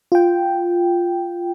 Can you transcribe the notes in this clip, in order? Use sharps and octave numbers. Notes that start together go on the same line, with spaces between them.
F4 G5